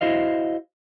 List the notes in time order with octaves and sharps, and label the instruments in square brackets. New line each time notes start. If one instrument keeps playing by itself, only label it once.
[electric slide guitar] E4 F#4 C5 D#5 F5